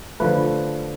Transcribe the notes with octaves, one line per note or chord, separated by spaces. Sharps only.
D3 F3 A3 B4